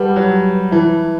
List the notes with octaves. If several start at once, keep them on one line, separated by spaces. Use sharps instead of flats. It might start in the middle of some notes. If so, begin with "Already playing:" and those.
Already playing: G3 G4 B4 F#5 A5
F#3
E3 E4 B4 E5 A5